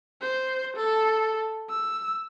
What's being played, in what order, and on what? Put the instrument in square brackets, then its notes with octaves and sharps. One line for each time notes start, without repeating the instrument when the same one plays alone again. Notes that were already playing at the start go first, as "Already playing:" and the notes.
[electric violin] C5
A4
E6